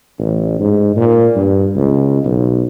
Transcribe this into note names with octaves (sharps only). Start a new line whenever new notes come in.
A1
G#2
A#2
G2
C#2
B1